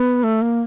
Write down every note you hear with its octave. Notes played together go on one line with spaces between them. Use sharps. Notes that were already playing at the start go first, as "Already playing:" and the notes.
Already playing: B3
A3
A#3